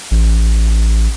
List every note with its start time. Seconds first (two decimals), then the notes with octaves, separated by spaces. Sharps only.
0.11 A1